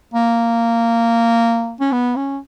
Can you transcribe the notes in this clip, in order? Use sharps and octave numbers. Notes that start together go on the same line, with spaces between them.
A#3
C#4
B3
C#4